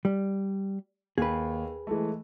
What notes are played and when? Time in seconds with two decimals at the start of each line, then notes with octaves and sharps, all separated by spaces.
0.05 G3
1.18 D#2 G#4 B4
1.87 E3 G#3 A3